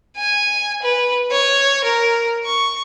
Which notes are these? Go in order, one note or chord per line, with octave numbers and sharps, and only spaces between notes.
G#5
B4
C#5
A#4
C#6